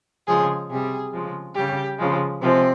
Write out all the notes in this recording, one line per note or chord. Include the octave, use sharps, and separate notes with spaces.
C#3 F3 G#3 G#4
C3 G3 G#4
C#3 F3 G#3
C#3 G3 G4
C#3 F3 G#3
C3 F3 G#3 C4